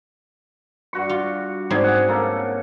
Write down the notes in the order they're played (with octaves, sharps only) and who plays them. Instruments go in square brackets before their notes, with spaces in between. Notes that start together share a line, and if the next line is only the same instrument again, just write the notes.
[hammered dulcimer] G2 F#4 C#6
[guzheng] F4
[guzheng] G#2 C4 E4 [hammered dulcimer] C#4 G#4 D5
[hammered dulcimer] F#5
C#3 A#3 A4